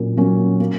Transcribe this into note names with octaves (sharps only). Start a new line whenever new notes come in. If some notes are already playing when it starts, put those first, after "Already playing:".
Already playing: A#2 F#3 A#3 C#4
F#3 A#3 C#4
A#3